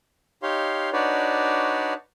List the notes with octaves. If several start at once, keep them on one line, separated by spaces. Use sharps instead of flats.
D#4 G4 C#5 F5 C6
D4 D#4 F#4 B4 C#5 D5